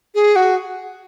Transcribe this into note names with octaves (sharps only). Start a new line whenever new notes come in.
G#4
F#4